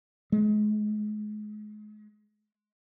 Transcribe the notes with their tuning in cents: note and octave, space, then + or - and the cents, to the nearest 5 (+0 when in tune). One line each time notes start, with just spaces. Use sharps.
G#3 +35